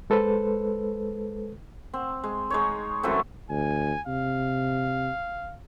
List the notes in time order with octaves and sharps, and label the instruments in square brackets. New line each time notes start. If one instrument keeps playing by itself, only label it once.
[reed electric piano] G#3 A4 B4 C5
[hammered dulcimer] C4
G#3
G#3 D#4 C#5
F#2 E3 A3 C4
[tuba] D2 [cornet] G#5
[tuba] C3 [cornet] F5